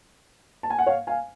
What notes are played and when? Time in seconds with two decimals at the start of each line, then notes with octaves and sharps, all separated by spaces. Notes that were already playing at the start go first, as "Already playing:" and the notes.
0.63 A5
0.70 G#5
0.79 F#5
0.86 C#5 F5
1.07 F5 G#5